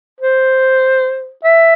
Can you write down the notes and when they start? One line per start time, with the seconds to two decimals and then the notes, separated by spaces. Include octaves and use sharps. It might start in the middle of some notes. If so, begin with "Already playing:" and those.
0.20 C5
1.45 E5